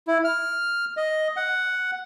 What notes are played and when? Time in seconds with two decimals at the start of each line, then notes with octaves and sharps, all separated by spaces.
0.07 E4
0.25 F6
0.97 D#5
1.37 F#5